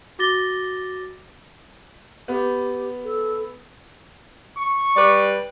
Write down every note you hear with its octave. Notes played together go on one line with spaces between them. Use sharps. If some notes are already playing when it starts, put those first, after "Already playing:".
F#4 D6 A6 A#6 G7
B3 G4
A4
C#6
G3 B4 D5